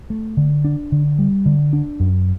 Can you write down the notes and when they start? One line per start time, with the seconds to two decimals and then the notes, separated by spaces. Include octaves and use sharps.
0.10 A3
0.37 D3
0.64 D4
0.92 D3
1.19 G3
1.46 D3
1.73 D4
2.00 F#2